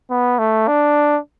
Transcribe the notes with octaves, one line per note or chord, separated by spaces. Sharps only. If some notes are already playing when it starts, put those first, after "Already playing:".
B3
A3
D4